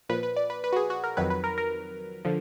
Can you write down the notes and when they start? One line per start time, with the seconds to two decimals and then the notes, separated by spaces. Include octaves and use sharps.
0.09 A#2 F3 B4
0.23 B4
0.36 D5
0.50 B4
0.64 B4
0.72 F#4
0.76 G#4
0.90 F#4
1.04 A#4
1.17 F2 D#3 F#3 B4
1.30 B4
1.44 A#4
1.58 A#4
2.25 D3 F3